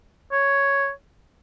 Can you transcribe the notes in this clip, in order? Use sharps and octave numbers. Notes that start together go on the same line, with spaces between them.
C#5